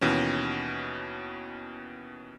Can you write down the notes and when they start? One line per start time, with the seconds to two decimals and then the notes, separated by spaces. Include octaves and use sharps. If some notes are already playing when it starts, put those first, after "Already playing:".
0.01 D#2 B2 E3 C#4